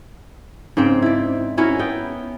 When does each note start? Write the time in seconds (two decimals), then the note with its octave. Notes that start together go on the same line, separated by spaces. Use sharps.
0.77 G#2 C#3 C4 G5
1.02 E4 D5
1.58 C#4 E4 F#4 A#4
1.79 B3 G5